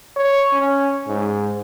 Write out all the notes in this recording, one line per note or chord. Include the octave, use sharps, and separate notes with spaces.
C#5
C#4
G#2